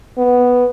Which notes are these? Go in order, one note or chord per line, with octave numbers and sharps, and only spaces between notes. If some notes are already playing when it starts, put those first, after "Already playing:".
B3